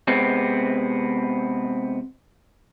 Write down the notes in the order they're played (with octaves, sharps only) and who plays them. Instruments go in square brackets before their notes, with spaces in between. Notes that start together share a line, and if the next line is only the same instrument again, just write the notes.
[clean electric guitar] C3 G#3 B3 C4